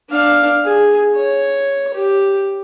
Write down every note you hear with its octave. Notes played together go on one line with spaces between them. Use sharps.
D4 F5
G#4
C#5
G4